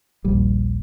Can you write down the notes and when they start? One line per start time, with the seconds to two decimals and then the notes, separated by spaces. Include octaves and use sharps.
0.24 D#1 A#1 G3